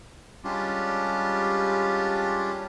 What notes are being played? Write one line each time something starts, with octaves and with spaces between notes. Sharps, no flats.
G3 G#3 C#4 D4 F4 G4